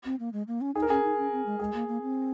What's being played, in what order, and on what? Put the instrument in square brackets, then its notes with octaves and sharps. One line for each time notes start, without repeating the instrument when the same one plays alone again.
[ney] C4
A#3
G#3
A#3
C#4
[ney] D#4 [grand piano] G#4
[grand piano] A#4
[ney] C#4 [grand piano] G#4
[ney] D#4
C#4
C4
G#3
[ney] G#3 [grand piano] G#4
[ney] A#3
A#3
C4